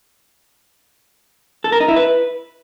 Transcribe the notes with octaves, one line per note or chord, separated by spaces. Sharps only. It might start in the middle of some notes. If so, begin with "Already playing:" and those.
A4
A#4
D#4
E4
B4